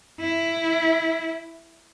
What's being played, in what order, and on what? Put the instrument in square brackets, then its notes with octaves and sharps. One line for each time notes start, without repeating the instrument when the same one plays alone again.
[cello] E4